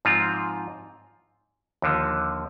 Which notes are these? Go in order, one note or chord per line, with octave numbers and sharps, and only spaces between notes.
G#2 F3 C4 F4
D#2 D3 F3